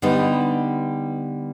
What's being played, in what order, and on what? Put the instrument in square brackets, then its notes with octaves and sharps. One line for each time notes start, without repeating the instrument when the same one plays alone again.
[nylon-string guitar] D3 G3 B3 D#4